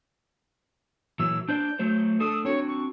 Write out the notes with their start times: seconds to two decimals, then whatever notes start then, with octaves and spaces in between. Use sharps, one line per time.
1.19 A#2 E3 F#3 E6
1.49 D4 C5 D5 G6
1.79 F#3 A3 C5
2.20 A3 D4 A4 D#6
2.45 C4 D4 F#4 C#5
2.68 C#6